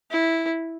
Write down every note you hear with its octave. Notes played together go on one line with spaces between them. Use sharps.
E4